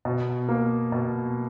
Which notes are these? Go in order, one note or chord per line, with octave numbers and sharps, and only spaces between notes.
B2
A#3
B2